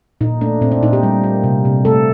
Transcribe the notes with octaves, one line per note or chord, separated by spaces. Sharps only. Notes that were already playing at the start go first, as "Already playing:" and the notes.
A#2 D#4
A3 D4
A#2 C4
D4
A#2 D#4
G4
G3
A#3
C3
C3
A3 A4